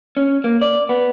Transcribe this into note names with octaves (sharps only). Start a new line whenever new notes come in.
C#4
A#3
D5
B3